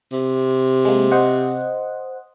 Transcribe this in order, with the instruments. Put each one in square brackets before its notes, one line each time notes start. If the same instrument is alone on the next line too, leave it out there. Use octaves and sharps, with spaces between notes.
[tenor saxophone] C3
[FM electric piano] G#3 A#3
C5 D#5 F#5